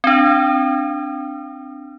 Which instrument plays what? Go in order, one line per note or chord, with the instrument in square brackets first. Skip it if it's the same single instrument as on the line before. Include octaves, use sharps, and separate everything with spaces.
[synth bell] C4 D4